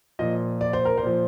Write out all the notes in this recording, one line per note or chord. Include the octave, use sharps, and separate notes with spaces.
A#2 F3 D#5
D5
C5
A#4
C5
A#2 F3